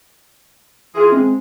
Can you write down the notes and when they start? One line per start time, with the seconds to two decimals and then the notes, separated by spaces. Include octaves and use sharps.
0.95 E3 F4 G#4
1.12 G#3 C4